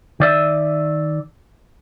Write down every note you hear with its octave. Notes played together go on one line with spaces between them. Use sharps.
D#3 D5 E5